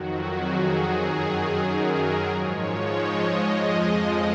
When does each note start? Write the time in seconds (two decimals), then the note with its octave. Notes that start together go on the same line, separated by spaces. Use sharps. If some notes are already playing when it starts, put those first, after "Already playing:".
Already playing: F2 D#3 F#3 F#4
0.37 G#4
1.01 F#2 D#3 F#3
1.64 A#4
1.97 A#4
2.29 G#2 F3 G#3 C#5
2.93 D#5
3.57 F2 F3 G#3